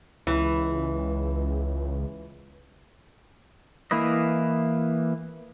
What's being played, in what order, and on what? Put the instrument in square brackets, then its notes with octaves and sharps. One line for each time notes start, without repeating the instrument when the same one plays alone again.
[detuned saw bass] C#2 [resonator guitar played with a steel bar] E3
[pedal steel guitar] E3 A#3 E4 B4 D#5